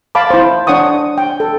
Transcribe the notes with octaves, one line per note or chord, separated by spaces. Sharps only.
F5 A5 B5 D6
E4 C5
D4 C#5 F#5 C#6 D#6
G5
A4